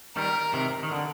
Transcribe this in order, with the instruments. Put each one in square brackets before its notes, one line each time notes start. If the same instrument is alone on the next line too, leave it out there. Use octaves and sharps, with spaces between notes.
[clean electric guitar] D#3 G3 [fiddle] A#4
[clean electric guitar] C3 D#3
D#3
D3